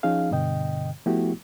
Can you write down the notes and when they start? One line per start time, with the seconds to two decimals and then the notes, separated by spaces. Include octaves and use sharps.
0.03 F3 C#4 D#4 G#4 F5
0.31 G2 B2 D3 D#5 G5
1.06 F3 A3 B3 E4 F#4 G4